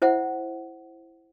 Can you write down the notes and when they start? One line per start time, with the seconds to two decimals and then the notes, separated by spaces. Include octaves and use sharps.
0.02 E4 C5 E5 F#5